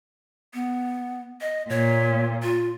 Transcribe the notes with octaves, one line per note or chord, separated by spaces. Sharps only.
B3
D#5
A#2 C#5
F4